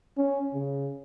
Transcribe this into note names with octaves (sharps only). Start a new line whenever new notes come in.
C#4
C#3